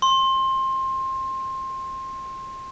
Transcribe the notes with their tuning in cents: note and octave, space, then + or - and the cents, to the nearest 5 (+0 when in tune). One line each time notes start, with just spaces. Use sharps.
C6 +25